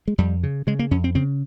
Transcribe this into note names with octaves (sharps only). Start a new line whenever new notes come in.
G#3
F2 G3
C#3
C#3 G#3
A#3
F2 C#4
C4
C#3 C4